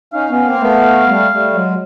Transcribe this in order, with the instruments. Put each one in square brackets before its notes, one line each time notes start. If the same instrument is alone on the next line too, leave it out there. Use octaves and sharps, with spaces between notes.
[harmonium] C#4 D#4 [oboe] F5
[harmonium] B3 C#4
A#3 C4
A3 B3
G3 A3
G3 A3
F#3 G#3